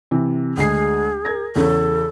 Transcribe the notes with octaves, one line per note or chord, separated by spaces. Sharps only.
C3 E3
D2 G#3 G#4 C7
A#4 G#6 A#6
E2 C#3 A4 C#5